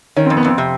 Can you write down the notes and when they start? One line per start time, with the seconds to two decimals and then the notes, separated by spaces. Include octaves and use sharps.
0.16 D#3 C#4
0.26 F2 C4
0.37 B3
0.44 F2 C4
0.58 C3